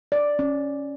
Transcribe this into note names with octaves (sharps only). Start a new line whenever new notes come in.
D5
C#4